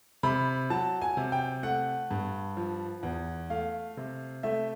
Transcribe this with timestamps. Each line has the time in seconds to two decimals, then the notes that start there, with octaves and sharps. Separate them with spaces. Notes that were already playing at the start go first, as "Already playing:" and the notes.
0.23 C3 B5
0.70 F#3 A5
1.02 G#5
1.17 C3
1.32 G5
1.63 A3 F#5
2.11 G2
2.57 F3
3.03 E2
3.50 A3 F5
3.97 C3
4.43 A3 E5